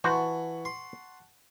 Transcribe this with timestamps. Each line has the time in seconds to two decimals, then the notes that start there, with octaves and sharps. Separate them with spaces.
0.04 E3 F#4 C5 F#5 A5 C#6
0.65 C6